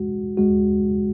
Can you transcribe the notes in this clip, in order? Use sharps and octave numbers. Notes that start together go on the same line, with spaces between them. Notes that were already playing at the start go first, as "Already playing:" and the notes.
Already playing: G#3 F#4
G#3 F#4